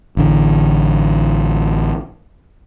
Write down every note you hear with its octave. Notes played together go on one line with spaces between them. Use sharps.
A1 D3